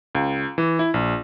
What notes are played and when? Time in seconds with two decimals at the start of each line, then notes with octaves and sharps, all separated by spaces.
0.15 C#2
0.58 E3
0.79 E4
0.94 A#1